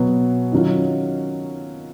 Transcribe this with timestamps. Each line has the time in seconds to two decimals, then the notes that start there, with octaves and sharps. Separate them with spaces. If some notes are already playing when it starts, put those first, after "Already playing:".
Already playing: B2 F#3 B3 F#4
0.52 D#3 F#3 C#4 F4